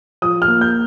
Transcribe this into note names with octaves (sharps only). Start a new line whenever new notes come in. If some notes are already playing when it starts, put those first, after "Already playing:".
F3 D#6
F6
A#3
G6